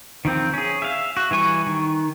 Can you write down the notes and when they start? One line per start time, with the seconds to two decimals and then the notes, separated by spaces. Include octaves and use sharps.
0.25 D#3 F3 C4
0.53 C#4 G#4
0.82 E5 F5
1.17 F#4
1.31 E3 G3 G#5 C#6
1.67 D#3